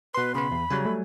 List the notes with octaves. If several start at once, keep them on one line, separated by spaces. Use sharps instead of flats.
B2 B4 C6
C#3 B3 B5
E2
C#3 F#3 G3 G#5
A3